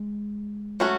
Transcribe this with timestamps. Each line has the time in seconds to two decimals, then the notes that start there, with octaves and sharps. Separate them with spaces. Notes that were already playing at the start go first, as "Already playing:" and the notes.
Already playing: G#3
0.80 F#3 A3 C#4 F#4